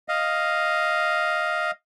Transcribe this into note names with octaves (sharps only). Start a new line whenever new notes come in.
D#5 F5